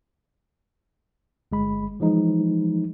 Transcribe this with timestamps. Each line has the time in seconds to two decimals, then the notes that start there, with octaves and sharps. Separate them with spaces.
1.52 G1 G#3 B5
2.00 E3 F3 G#3 D#4